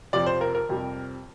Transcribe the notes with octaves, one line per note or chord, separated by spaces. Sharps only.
F2 C3 F3 D5
C5
A#4
A#4
F2 C3 G3